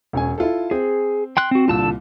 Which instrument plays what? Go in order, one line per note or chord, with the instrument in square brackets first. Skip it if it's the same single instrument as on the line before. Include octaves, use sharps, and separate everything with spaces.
[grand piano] E1 C#4 G#5
E4 F4 A4
[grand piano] C4 [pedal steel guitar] G#4
[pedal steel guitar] G5 C6 F#6
C4 F#4
[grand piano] C2 A#2 [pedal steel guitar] D3 A5 E6